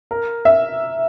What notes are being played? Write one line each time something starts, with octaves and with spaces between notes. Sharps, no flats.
A#4
E5